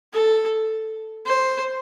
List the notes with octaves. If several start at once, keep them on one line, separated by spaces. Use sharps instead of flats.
A4
C5